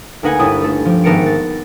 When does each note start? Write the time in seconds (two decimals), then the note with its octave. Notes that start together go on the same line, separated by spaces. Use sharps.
0.23 D2 A#3 D#4 B4 F#5 G#5
0.39 G1 D4 E4 D#6 D#7
0.62 A3 A4
0.85 F3 G4
1.04 G#1 B3 A#4 A5 C#7 D7
1.26 A6